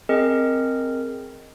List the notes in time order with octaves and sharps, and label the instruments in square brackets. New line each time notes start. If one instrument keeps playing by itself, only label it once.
[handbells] C4 G#4 A#4 D#5